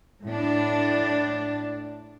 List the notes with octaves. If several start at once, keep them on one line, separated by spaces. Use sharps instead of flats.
A2 D4